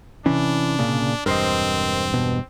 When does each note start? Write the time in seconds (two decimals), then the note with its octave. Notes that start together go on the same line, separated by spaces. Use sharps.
0.26 C3 E3 C#4 D4
0.79 A#2 C#3
1.26 E1 G2 C4 A#4 C5 D#5
2.14 B2